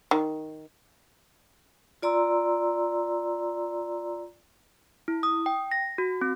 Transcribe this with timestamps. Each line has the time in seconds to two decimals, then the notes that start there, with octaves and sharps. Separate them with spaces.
0.11 D#3
2.02 F4 D5 A#5 C6 E6
5.08 E4
5.23 D#6
5.46 G5
5.71 A#6
5.98 F#4
6.21 C4